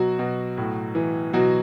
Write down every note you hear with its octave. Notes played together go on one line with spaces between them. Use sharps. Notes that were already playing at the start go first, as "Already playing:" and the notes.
Already playing: B2 F#3 F#4
B2
A2
E3
B2 F#3 F#4